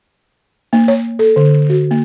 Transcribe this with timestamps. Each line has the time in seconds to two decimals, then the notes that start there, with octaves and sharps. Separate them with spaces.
0.73 A#3
0.88 C#5
1.19 A4
1.36 D3
1.70 F#4
1.91 A#3